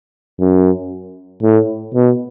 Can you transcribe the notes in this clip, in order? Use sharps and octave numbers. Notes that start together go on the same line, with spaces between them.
F#2
A2
B2